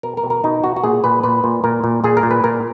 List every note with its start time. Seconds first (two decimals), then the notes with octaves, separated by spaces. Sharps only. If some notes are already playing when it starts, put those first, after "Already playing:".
0.03 B2 A#4
0.17 A#4
0.24 B2
0.30 A#4
0.44 B2 D#4
0.64 B2 F#4
0.76 F#4
0.84 A#2 G#4
1.04 A#2 B4
1.23 A#2 B4
1.44 A#2
1.64 A#2 A#4
1.84 A#2
2.04 A#2 G#4
2.17 A#4
2.23 A#2
2.31 B4
2.44 A#2 A#4